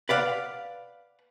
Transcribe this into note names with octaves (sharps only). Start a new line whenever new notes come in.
B4 D5 F5 F#5